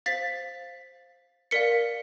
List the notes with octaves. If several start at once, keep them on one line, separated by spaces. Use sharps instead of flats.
C5 F5 A6 B6
A#4 D5 F5 B6 C#7